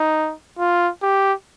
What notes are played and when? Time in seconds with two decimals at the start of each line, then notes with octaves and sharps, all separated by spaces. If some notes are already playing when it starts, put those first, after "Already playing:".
Already playing: D#4
0.59 F4
1.02 G4